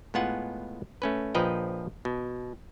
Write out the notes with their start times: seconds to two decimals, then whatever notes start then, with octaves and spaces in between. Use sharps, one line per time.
0.14 A2 G#3 B3 F4 F#5 G#5
1.02 A3 C#4 B4
1.35 A#1 F3 B4 D#5 G5 A#5
2.05 B2